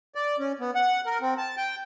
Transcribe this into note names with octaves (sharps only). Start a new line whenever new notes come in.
D5
C#4
B3
F#5
A#4
C4
A5
G5